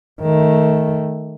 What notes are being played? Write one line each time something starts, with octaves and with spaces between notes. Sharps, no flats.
D#3 A3